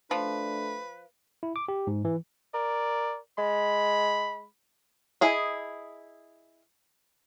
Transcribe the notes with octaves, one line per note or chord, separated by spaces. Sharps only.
F3 A3 D4 B4
E4
D6
G4
G#2
E3
A#4 D5
G#3 B5
E4 G#4 D#5